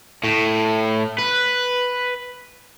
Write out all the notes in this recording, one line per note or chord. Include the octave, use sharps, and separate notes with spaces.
A2
B4